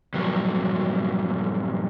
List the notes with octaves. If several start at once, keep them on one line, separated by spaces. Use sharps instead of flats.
G2 A#2 F3 F#3